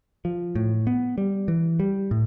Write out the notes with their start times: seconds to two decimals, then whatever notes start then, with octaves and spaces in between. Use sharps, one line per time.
0.25 F3
0.55 A2
0.87 B3
1.18 G3
1.48 E3
1.80 G3
2.11 A2